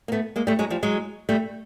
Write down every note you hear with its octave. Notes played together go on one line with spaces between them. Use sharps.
A#3
A3 B3
G#3 A#3
G3 A3
F#3 G#3
F3 G3
F#3 G#3
G3 A3